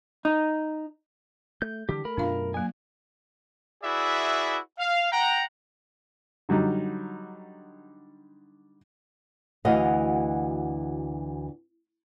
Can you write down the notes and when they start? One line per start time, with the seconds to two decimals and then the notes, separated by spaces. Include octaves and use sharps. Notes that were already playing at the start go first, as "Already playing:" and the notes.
0.25 D#4
1.62 A3 G6
1.89 D3 E3 G3 G4
2.05 A3 A#4 B5
2.17 F#2 B2 A3 D4 F4 F5
2.54 F#3 A#3 G#5
3.83 E4 F#4 G#4 B4 D5 E5
4.79 F5
5.12 F#5 G5 A#5
6.49 D3 F#3 G3 D#4
9.65 D2 E3 F#4 D#5 F5